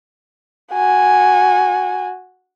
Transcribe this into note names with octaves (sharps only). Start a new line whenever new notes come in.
F#4 G#5